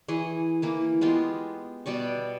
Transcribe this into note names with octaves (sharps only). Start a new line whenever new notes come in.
E3 G#4 C#6
E3 A#3 E4
G#3 B3 F4 G4
B2 G3 D5 C#6